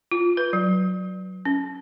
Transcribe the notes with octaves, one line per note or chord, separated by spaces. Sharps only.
F4
B4
F#3
C#4